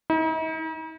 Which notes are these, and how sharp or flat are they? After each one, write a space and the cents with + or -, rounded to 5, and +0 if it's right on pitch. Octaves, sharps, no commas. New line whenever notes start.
D#4 +45